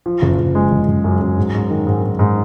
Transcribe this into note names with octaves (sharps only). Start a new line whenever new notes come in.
F3
F#1
F#1
G#3
F#1
F#1
F#2
F#2
G#2
G#2
D#3
G#2
G#2
G#2